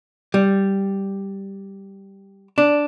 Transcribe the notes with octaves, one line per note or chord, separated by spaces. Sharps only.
G3
D4